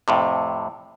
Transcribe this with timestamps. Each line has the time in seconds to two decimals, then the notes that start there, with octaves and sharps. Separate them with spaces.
0.08 F2 A2 C3